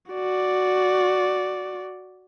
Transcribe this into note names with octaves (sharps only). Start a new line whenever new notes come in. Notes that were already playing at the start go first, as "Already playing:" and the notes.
F#4 D5